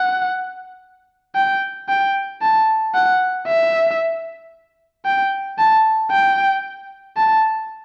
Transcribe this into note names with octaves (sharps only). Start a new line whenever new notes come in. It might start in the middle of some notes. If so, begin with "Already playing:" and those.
Already playing: F#5
G5
G5
A5
F#5
E5
G5
A5
G5
A5